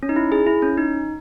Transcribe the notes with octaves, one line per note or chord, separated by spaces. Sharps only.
C#4
D#4
E4
G#4
E4
C#4
D#4